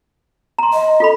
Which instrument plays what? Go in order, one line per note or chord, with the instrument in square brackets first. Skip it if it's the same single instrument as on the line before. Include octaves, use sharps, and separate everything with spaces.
[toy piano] A#5 C6
[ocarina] D#5
[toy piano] F4 A4 B5